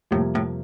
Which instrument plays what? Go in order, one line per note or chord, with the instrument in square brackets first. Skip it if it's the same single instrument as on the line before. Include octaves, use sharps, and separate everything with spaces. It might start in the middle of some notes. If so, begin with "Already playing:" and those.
[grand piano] F2 C3 G3 A#3 [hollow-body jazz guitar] A2
[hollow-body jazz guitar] A2